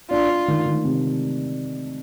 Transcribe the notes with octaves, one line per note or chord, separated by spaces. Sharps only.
D4 F4
D4
D#3
D#3
C3